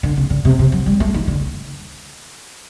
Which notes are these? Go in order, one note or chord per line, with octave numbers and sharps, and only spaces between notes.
D3
C#3
D3
C3
C3
F#3
G3
A3
D#3
D3